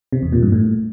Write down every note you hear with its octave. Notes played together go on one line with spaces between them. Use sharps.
C3
E2
A#2
G2
A2